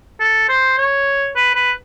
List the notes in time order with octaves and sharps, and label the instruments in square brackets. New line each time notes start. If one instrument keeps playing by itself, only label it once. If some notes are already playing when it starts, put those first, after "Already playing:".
[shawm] A4
C5
C#5
B4
B4